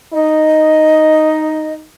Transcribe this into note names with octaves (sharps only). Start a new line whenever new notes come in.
D#4 D#5